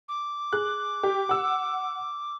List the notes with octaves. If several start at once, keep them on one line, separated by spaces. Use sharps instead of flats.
D6
G#4 F#6
G4
F#5 E6